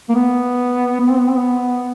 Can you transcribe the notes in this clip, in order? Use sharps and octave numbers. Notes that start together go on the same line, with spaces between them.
A#3
B3
B3
C4
B3
C4
B3